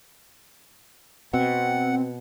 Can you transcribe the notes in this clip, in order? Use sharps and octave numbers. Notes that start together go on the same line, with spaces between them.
B2 C4 F#5